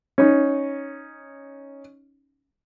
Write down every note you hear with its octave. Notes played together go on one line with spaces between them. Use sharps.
C#4 D#4